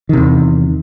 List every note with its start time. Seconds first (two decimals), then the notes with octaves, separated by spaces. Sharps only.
0.09 D#3
0.13 C3
0.17 E2